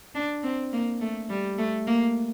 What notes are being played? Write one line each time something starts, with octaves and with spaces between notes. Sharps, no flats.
D4
C4
A#3
A3
G3
A3
A#3